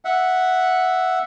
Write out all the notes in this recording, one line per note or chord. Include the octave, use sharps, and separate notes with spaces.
E5 F#5